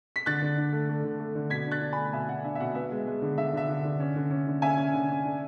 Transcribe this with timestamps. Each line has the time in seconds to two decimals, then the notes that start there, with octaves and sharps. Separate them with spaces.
0.16 B6
0.26 D3 F#6 A6
0.42 D3
0.57 D4
0.72 A3
0.89 A3
1.04 D3
1.20 A3
1.35 D3
1.50 B2 G#6 B6
1.67 D4 F#6 A6
1.82 D4
1.92 G#5 B5
1.98 A3
2.13 B2 E5 G#5
2.29 B2 F#5
2.44 D4 E5
2.55 E5
2.60 B2 F#5
2.75 B3 E5
2.91 G#3
3.07 G#3
3.22 D3
3.38 D3 E5
3.53 D3 E5
3.68 D3
3.85 D3
4.00 C#4
4.16 D3
4.30 C#4
4.47 D3
4.62 C#4 E5 G#5
4.77 C#4
4.93 D3
5.09 C#4
5.25 D4